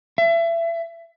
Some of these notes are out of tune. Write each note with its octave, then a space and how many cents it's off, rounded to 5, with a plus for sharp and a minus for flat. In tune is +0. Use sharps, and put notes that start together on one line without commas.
E5 +30